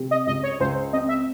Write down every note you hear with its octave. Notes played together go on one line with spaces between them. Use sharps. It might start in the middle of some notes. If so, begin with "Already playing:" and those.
Already playing: C3
D#5
C#2 D#5
C#5
C#2 C5
C4 D#5
E5